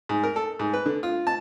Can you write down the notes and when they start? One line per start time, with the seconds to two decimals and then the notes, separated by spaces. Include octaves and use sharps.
0.09 G#2
0.23 A#4
0.36 A4
0.59 G#2
0.74 B4
0.86 D3
1.03 F4
1.27 A5